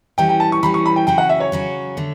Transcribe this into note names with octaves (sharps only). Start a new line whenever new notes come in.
E3 G3 C#4 G5
G5
A5
C#6
E3 G3 C#4 B5
C#6
B5
G5
C#3 F#3 C#4 F#4 G5
F#5
E5
C#5
C#3 F#3 C#4 F#4
D3 A3